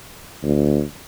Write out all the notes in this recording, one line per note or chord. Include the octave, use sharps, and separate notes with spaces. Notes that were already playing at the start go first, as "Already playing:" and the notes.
D2